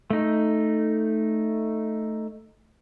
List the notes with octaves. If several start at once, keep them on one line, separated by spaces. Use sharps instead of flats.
A3 D#4